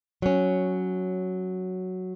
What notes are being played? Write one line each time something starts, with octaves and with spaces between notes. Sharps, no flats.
F#3 C#4